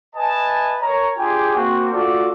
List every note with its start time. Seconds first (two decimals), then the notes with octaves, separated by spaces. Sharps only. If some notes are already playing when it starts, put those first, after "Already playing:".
0.15 B4 D#5 E5 G#5 A5
0.81 A#4 C#5 A#5
1.18 D4 F4 G4 G#4 G5 G#5
1.56 A#3 C4 F#4
1.93 A3 D4 F4 F#4 A4 D5